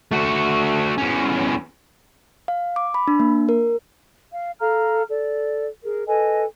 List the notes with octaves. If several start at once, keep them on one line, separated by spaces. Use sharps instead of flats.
A3 F#4
E2 C#4
F5
D6
B5
D4
A#3
A#4
F5
A4 F5 A#5 F6
A4 D5
G#4 A#4
A4 B4 D#5 G#5